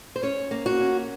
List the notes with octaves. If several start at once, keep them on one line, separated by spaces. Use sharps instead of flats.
C5
C#4 C#5
A#3
F#4
C#4